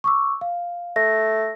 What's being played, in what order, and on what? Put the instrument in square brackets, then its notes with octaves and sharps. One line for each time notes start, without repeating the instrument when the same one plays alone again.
[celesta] C#6 D6 E6
F5
[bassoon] A3 [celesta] A#6